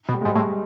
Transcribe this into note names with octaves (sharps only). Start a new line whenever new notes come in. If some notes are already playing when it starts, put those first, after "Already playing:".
B2
G3
G#3
G#2
G3
A2 G#3